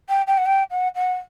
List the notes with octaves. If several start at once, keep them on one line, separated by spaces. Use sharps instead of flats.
G5
G5
F#5
G5
F#5
F#5